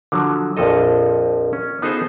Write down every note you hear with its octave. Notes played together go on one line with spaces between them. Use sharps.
D3 F3 F#3
A#1 F2 F3 A4 D#5
C#4
B3 D#4 F4 G#4 A4 C5